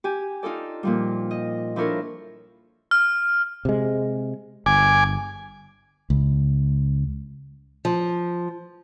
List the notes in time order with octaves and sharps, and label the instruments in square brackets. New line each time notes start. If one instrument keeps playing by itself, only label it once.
[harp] G4 G#5
D#4 F4 A4 D5
A#2 F3 G3
D#5
F3 D4 E4 A4 A#4 C#5
[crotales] F6
[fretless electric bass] C3 G#3
[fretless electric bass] G1 [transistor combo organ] G#5 D6
[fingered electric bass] C#2
[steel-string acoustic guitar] F3